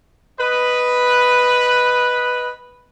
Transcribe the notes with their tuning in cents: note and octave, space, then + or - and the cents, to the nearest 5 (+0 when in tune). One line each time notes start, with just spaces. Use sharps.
B4 +0 D#5 +0